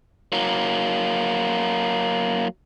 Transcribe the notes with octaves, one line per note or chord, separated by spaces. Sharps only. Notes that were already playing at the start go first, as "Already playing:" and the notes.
F#3 A#3